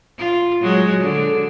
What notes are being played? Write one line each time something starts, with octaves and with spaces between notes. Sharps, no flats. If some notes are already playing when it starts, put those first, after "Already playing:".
F4
F#3 G#3
D3